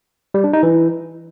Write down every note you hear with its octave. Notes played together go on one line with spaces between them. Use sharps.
G3
D4
D#4
E3